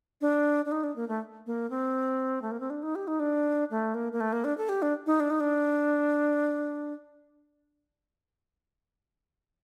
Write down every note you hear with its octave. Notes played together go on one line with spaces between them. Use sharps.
D4
D4
D#4
D4
A#3
A3
A#3
C4
A3
A#3
C4
D4
D#4
G4
D#4
D4
A3
A#3
A#3
A3
A#3
D4
A4
G4
D4
D#4
D4
D#4
D4